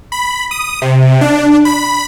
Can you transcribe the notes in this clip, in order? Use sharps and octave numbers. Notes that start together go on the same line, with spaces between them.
B5
D#6
C3
D4
B5